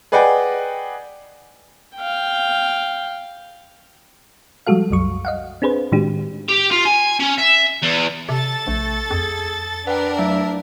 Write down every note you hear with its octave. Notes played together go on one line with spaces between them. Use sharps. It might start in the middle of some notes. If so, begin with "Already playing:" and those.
G#4 B4 D5 D#5 F#5 G5
F5 G5
F3 G3 G#3 F#4 A4 F5
C2 F#2 F#3 C#6
D#5 F5 F#5
C4 D4 G#4 B4 C5
A2 D#3 G#3 D4 F#4 G4
G4
F4
G#5
C#4
E5
E2
C3 A4 A6
A#1 A3
F2 G#4
D4 A#4 B4 F#5 G5
F#3 A3 E5 A5